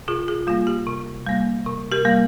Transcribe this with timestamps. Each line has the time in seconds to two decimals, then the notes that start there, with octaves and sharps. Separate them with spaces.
0.08 C3 F4 G#4
0.28 F4 G#4
0.47 G3 A#3 F4
0.67 G4
0.87 C3
1.26 G3 A#3
1.66 C3
1.92 G4 A#4
2.05 G3 A#3